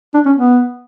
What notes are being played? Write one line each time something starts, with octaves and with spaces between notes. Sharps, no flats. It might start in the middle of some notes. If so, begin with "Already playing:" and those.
D4
C#4
B3